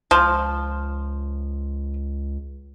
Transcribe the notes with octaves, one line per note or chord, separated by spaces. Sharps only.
C#2 F3